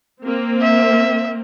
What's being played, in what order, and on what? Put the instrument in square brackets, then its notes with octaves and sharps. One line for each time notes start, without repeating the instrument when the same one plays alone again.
[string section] A#3 C4
[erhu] E5